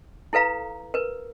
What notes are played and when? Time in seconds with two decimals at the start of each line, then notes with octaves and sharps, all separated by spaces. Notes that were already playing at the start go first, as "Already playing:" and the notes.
0.33 E4 A4 B4 F5 A#5
0.94 A#4 B4